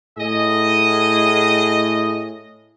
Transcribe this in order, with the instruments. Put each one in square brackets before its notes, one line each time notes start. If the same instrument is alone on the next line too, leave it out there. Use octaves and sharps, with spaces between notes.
[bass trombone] A2 [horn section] G#4 D#5